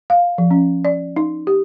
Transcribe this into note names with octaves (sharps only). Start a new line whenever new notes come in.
F5
F3
C#4
D5
D#4
G4